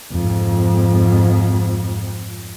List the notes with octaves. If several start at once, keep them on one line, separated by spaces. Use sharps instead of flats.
F2 G#2